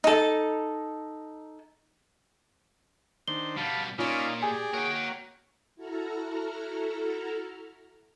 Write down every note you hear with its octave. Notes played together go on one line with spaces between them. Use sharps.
D#4 A4
D#3 D4 C5 G7
B2 G3 F5 A5 B5
A#2 C#4 D#4 F4 D5 F5
G4 G#4 D5 G#5
A#3 F#4 A#4 C#5 G5
E4 F#4 A4 A#5 F6